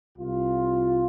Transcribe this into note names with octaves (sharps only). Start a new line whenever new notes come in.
C2 F4